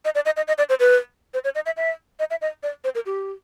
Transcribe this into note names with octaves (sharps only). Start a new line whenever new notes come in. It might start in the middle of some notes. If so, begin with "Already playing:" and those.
D#5
D5
D#5
D#5
D#5
D5
C5
B4
C5
C#5
D#5
E5
E5
D#5
E5
D#5
D5
C5
A#4
G4